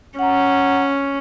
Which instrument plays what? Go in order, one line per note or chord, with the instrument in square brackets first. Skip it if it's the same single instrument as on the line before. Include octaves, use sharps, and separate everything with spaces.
[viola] C#4 [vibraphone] F#5 A#5